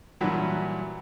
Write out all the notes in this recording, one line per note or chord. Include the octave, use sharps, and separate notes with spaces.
G2 A#2 E3 F#3 E4